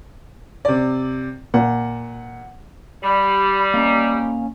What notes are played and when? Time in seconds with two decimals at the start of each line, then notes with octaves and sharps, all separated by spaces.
0.65 C3 D5
1.54 A#2 F#5
3.03 G3 B5
3.74 A#3 C#4 D#5 A#5